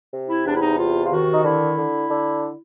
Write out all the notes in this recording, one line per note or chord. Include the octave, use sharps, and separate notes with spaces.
C3
E4
E2 D4
E4
D#4
C3 F4
F4
D#3 F#4
D#4
D3 E4
D3
D3